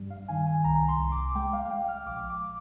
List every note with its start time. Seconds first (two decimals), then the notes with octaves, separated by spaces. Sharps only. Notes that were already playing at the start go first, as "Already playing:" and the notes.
Already playing: G2 G3
0.10 F5
0.28 D#3 G#5
0.46 G#5
0.64 C2 A#5
0.88 C6
0.99 C2
1.12 D6
1.35 G#3 G5
1.53 F5
1.65 F5
1.71 G#3 G5
1.88 F6
2.06 A#1 D6
2.30 D6